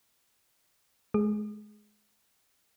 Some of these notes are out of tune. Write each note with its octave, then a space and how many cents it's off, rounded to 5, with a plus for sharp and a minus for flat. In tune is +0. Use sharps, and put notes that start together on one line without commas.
G#3 +25 G#4 +0